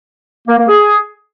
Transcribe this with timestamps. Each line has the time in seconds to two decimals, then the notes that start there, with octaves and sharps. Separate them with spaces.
0.48 A#3
0.58 A#3
0.68 G#4